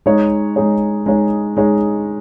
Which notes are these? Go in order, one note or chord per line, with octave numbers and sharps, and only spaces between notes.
G#3 D#4 G#4 C#5
G#3 D#4 G#4 C#5
G#3 D#4 G#4 C#5
G#3 D#4 G#4 C#5